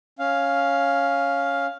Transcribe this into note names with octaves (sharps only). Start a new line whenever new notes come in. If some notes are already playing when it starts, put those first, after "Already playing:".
C#4 F5